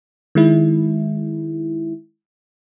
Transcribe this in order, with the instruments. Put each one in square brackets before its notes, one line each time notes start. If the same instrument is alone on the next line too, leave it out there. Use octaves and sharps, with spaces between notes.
[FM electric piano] D#3 G#3 E4